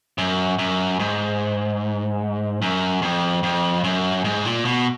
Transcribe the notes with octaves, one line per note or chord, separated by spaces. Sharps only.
F#2
F#2
G#2
F#2
F2
F2
F#2
G#2
A#2
B2